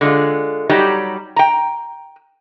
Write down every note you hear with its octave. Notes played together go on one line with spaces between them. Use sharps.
D3 G#3 F4
F#3 G3 D#4 G4
G5 A#5